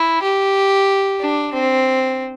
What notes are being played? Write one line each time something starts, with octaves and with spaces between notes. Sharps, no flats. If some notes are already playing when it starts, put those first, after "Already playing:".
Already playing: E4
G4
D4
C4